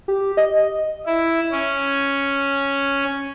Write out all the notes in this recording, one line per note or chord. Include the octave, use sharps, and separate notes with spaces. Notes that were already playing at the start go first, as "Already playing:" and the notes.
G4
D#5
E4
C#4